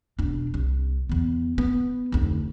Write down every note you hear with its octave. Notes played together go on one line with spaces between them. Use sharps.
E1 D4
C2
E2 B3
B3
F1 D2